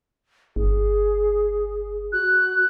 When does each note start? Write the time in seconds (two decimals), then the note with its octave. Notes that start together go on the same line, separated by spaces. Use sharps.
0.56 G1 G#4
2.12 F#4 F#6